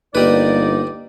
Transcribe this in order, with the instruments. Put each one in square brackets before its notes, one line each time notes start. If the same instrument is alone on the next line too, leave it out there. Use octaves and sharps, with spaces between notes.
[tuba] G1 [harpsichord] G3 B4 [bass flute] A#3 [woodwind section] D#4 D5